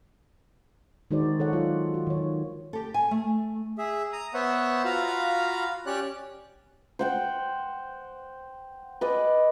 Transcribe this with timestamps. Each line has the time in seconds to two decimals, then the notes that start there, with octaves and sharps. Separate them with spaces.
1.11 D#3 G#3 D#4 F#4 C5 D5
1.39 D#3 A4 C#5 F#5
1.53 F#3 F4
1.94 F#4
2.07 D#3 C#5
2.73 G4 A4
2.94 G#5
3.11 A3
3.78 G#4 E5
4.13 A#5 D#6
4.34 B3 C5 C#5 E5 F#5
4.85 F4 F#4 F5 A#5 B5
5.86 C#4 G4 C#5 D5 F#6
6.99 C5 F#5 G5
9.01 B4 D5 D#5 G#5